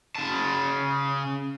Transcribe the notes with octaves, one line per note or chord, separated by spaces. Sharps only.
C#3 A5